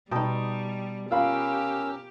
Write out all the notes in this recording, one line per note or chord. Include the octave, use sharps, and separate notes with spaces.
B2 G3 D#4 G5 A5 D#6
C#4 F4 G4 A#4 F5 B5 E6